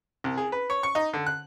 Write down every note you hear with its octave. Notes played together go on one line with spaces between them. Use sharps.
C2
G#4
B4
C#5
C#6
D#4
D3
F#6